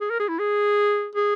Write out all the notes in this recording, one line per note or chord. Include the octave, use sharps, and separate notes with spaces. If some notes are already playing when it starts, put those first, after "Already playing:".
G#4
A#4
G#4
E4
G#4
G#4